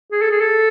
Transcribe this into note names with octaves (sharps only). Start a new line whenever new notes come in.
G#4
A4
G#4
A4